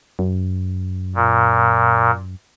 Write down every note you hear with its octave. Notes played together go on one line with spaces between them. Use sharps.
F#2
A#2